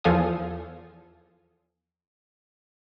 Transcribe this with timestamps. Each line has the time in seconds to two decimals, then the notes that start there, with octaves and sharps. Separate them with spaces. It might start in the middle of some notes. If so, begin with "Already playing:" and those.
0.04 E2 F3 A4 F5 G#5 D#6